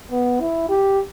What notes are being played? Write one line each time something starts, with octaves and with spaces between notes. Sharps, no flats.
B3
E4
G4